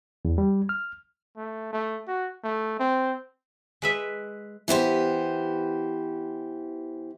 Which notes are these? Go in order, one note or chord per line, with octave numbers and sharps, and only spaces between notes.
E2
G3
F6
A3
A3
F#4
A3
C4
G#3 B4 E5
E3 B3 G4 C5